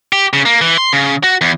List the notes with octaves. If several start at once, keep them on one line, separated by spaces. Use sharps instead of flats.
G4
C#3
A#3
E3
C6
C#3
F#4
E2